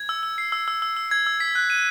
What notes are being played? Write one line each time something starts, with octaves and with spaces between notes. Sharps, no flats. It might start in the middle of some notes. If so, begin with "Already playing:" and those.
Already playing: G#6
E6
E6
C7
E6
E6
E6
E6
G#6
E6
B6
F#6
D#7